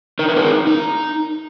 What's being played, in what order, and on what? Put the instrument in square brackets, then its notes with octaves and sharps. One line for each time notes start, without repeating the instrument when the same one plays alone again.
[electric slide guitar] D#4 A#4
B4
G#4 A#4
D#4